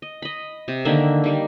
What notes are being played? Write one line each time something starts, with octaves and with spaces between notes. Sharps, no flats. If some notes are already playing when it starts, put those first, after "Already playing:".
D#5
D#5 B5
C3
D3 D#3 A#3 E5
D#3 G3